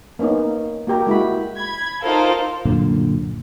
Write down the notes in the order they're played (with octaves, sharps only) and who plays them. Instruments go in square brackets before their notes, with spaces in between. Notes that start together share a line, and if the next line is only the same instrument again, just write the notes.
[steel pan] A#3 B3 C#4 D#4
A#3 F#4 G4 A#5
G#3 E4 F#4 B5
[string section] B5 G#6
D#4 F4 A4 A#4 C5 F5
[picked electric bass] C2 F#2 A#2 D3